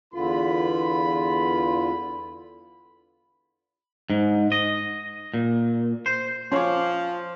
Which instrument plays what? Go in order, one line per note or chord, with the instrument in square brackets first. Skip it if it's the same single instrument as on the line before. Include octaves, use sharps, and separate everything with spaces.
[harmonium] E2 D3 F4 [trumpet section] B5
[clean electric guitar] G#2
D#5
A#2
C5
[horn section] F3 [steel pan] C#4 C#5 [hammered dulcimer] C5 D6